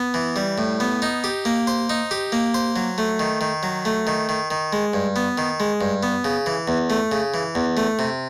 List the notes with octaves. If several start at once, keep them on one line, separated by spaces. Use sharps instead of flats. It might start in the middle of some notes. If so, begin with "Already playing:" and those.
Already playing: B3
E3
G3
A2
B3
D#4
G4
A#3
C5
D#4
G4
A#3
C5
F#3
A3
D#3
D#3
F#3
A3
D#3
D#3
D#3
G#3
G2
B3
D#3
G#3
G2
B3
C#3
E3
E2
A3
C#3
E3
E2
A3
C3